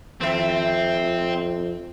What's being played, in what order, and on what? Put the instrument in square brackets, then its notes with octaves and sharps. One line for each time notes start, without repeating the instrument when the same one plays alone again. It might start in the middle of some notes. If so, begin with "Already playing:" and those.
[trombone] F2 [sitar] D#3 A4 E5 [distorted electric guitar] C4